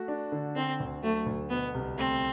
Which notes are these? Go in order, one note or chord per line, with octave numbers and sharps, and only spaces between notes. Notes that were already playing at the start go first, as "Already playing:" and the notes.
Already playing: A3 F#4
D4
D3
D3 C4
D2
F#3 A3
D2
B2 B3
C2
A3 C4